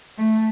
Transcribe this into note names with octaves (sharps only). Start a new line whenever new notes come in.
A3